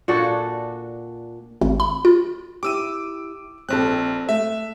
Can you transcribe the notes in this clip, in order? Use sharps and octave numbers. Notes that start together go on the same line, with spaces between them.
A#2 D4 F#4 A4
G#1
B5
F4
E4 G4 D6 E6 D#7
A#1 C4 A4 F#6
A3 E5